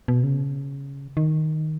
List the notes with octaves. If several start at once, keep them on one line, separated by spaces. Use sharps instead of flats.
B2
C#3
D#3